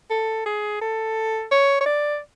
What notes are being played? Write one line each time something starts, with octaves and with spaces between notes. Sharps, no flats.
A4
G#4
A4
C#5
C#5
D5